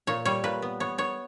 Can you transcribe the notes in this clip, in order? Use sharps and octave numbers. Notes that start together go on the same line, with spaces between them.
A#2 C#5
G3 C#5
A#2 B4
B3
B3 C#5
B3 C#5